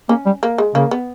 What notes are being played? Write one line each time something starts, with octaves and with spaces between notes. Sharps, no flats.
A#3 C#4
G3
A#3
G#3
C#3 A#3
B3